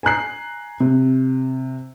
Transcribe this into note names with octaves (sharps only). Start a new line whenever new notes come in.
G#5 A#5 F#6 C7
C3